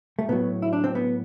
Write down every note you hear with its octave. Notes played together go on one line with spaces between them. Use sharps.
A3
A2 F#3 B3
E4
D4
C4
B3